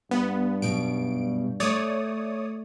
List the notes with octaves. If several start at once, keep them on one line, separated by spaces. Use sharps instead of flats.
G2 B3
F#2 B2 G3 D7
A3 C#5 D5 D#6